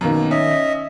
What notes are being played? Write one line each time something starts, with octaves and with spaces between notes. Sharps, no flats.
F#2 B2 D#3 A#3
C#4 D#5 E5